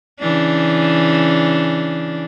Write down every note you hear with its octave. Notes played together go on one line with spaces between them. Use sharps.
C#3 E3 D4